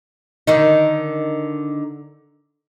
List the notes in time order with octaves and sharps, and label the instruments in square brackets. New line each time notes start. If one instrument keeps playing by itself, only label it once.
[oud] D3 D#3 D#4